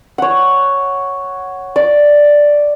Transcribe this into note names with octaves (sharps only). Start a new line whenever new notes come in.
C#5 F#5
D5